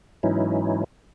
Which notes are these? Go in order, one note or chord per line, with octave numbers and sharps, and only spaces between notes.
G#2 E3 F#3 C#4 D#4 E4